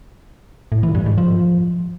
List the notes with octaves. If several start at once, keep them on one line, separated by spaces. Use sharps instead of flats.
A2
E3
G2
G#2
F3